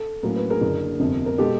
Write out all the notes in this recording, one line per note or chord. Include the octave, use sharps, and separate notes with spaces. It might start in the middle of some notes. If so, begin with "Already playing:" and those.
Already playing: A4
A2 F#3 A#3 C#4 A#4
B4
G#4 A#4
F#1 F#2 D3
G1 F2 C3
A#4
B2 G#3 G4 A4